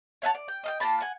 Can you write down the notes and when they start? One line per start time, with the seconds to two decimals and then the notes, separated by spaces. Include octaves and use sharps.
0.22 C#5 E5 F#5 A5
0.35 D5
0.48 G5
0.63 D#5 F5 G5
0.80 A#3 F4 A5 B5
1.00 F#5 G#5